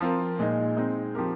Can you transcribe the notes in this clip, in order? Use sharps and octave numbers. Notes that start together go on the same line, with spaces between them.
F3 C4 F4 A#4
A#2 G#3 D#4
G#3 C4 D#4
F3 C4 G4 A#4